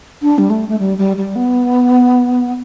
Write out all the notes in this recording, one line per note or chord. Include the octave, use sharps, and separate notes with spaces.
D4
G3
A3
A3
G3
G3
G3
B3